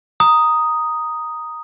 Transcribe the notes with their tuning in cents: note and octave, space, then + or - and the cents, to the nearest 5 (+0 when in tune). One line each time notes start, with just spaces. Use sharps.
A#5 +5 D#6 +0